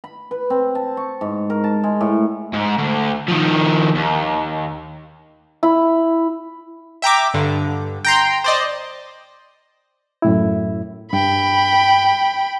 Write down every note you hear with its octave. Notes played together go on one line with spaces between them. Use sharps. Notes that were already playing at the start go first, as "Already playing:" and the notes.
B5
B4
C4
A5
C#6
G#2
A#4
A5
G#3
A2
G#2
D2
D#3 F3
D#2
E4
E5 G5 A#5 D6
G2 D3
G5 A#5 C6
C5 D5 D#5
F#2 A2 E4
G2 G5 B5